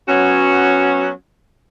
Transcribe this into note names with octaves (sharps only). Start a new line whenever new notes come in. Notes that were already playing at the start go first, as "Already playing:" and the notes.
F#3 B3 C#4 F#4